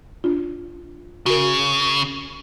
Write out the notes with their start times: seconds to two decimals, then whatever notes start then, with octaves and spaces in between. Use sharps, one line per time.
0.24 D4 F4
1.26 C#3 F#4 A#4